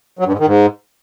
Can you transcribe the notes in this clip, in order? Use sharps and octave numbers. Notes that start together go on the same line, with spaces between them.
F#3
G2
G#2
D#3
G#2